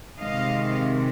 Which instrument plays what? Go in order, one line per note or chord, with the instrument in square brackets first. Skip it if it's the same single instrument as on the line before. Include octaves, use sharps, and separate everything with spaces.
[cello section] C3 D#3 G#3 D#5 F5